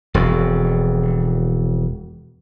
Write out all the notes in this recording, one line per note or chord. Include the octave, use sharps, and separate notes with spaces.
E1 F2